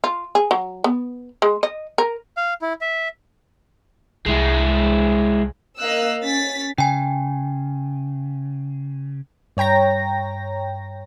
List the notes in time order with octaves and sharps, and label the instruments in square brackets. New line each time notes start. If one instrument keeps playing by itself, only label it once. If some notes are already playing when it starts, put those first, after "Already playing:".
[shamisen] F4
G#4
F#3
B3
G#3
D#5
A#4
[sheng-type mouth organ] F5
E4
E5
[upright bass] C2 [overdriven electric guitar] G#3 E4
[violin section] A#3 D#5 F5 E6 F#6
C#4 A6 B6
[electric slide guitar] C#3 [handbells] G5 G#5
[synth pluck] G2 C#5 G5 A#5 A#6